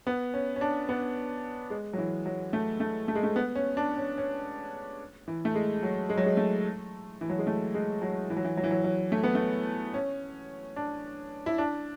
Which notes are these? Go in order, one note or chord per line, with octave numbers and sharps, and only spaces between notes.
B3
C#4
C#4
D4
B3
G#3
F#3
E3
F#3
A3
A3
A3
G#3
A3
B3
C#4
D4
C#4
C#4
E3
A3
G#3
F#3
G#3
F#3
G#3
A3
E3
F#3
G#3
A3
G#3
F#3
E3
F#3
E3
F#3
E3
F#3
F#3
A3
B3
A3
C#4
D4
E4
D4